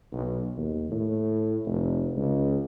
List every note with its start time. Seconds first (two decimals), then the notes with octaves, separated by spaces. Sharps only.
0.12 B1
0.57 D#2
0.91 A2
1.66 F1
2.17 C#2